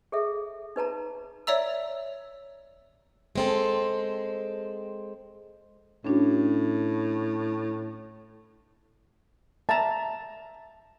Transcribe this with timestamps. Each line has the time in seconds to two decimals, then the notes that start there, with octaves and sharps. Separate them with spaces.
0.12 G#4 A4 E5
0.76 D#4 B4 A5 A#5
1.47 C#5 D5 E5 A#5 E6
3.35 G#3 C4 A4
6.05 A2 C#4 D4 F#4
9.69 E5 A5 A#5